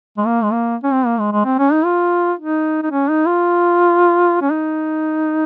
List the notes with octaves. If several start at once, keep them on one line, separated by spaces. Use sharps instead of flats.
G#3
A#3
G#3
A#3
C#4
C4
A#3
G#3
G#3
C4
C#4
D#4
F4
D#4
D#4
C#4
D#4
F4
C#4
D#4